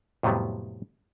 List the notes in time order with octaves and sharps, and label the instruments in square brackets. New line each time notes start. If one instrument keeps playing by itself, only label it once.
[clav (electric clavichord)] F2 A2 C3 F#3 G3 B3